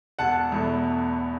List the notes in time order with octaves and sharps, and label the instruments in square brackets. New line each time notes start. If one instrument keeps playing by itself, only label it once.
[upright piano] E1 F#5 A5
E2 B2 A3